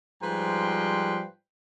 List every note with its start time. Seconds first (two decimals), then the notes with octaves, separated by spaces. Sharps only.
0.22 G#2 F3 G3 B4 G5 C6